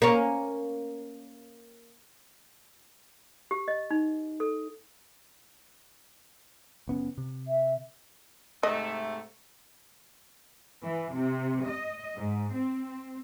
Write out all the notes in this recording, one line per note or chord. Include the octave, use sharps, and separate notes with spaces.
A#3 C#4
G4
D#5
D#4
A4
F#1 B3 C#4
C3
E5
G#2 C3 A3 D#5
E3
C3
D#5
G#2
C4